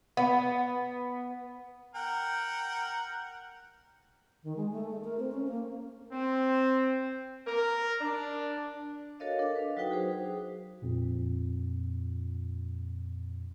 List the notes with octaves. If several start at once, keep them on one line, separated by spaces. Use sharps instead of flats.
B3
A#4 F#5 G5
D#3
G#3
A3
A3
A#4
C4
C#4
A#3
C4
A#4
D4
F#4 A4 A#4 C#5 D#5 F5
D4 A4 A#4
B4 F5
F#3 D#4 F#4 B4 G5 D#6
F#4 G#4 C5
F2 A#2